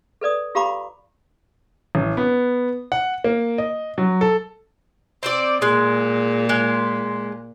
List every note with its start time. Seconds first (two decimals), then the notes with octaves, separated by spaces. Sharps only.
0.21 A4 B4 D5 D#6
0.55 F4 G4 F5 A#5 B5 D6
1.95 A1
2.17 B3
2.92 F#5
3.24 A#3
3.58 D#5
3.98 F#3
4.21 A4
5.23 C4 C5 D5
5.62 A#2 G#3
6.49 G#3